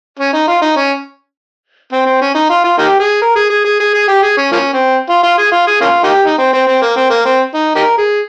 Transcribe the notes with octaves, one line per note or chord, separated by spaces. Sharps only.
C#4
D#4
F4
D#4
C#4
C4
C4
C#4
D#4
F4
F4
A#3 D#4 G4
G#4
A#4
G#4
G#4
G#4
G#4
G#4
G4
G#4
C#4
F3 A#3 C#4
C4
F4
F4
G#4
F4
G#4
A#3 C#4 F4
A#3 D#4 G4
D#4
C4
C4
C4
A#3
C4
A#3
C4
D#4
D#4 G4 A#4
G#4